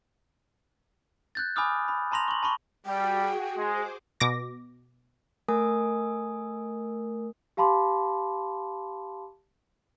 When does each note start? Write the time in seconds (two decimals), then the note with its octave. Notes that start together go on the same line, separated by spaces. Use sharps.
1.35 F#6 G6 A6
1.56 G#5 B5 D6 D#6 F6
1.88 B5
2.12 A5 A#5 C6 A#6 F7
2.28 C#6 F#7
2.43 A5 B5 C#6
2.86 G3 F#4 G#4 G5
3.57 G#3 G#4 C5 D6
4.20 B2 D6 A#6
5.48 A3 A#4 G#5 D#6
7.57 G4 F5 A5 B5 C6 D6